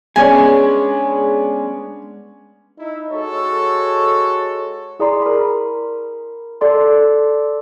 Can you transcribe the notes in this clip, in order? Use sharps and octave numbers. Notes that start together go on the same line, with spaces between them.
G#3 B3 C#4 D4 G#4 G#5
D#4 E4
G#3 F#4 A4 C#5
E4 G#4 D5 A#5 C6
A#4 B5
A4 D5 C6